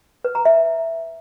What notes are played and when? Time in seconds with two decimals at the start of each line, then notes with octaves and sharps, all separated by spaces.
0.25 B4
0.35 A#5
0.45 E5